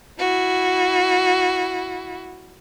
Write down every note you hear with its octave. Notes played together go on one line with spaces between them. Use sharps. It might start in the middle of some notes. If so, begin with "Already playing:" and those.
E4 F#4